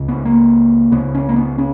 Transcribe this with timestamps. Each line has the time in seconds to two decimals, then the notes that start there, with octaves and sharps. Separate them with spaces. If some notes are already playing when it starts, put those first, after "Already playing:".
Already playing: C#2 C#3
0.08 B3
0.25 A#3
0.91 C#2 C#3 B3
1.15 C#4
1.29 A#3
1.36 B3
1.58 C#4